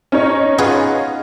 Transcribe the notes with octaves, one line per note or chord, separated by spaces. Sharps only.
C#4 D#4 C#5
B3 F4 G#4